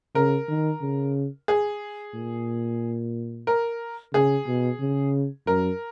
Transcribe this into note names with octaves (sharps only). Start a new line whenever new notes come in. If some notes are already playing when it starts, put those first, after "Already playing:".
C#3 A#4
D#3
C#3
G#4
A#2
A#4
C#3 G#4
B2
C#3
F#2 A#4